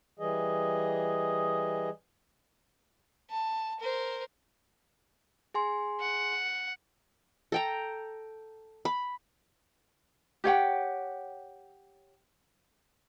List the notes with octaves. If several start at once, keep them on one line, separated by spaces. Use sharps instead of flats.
E3 G3 G#4 D#5
A5
A#4 C5
G#4 G#5 C6
F#5
A4 G5 A#5
B5
G4 C#5 F#5 G5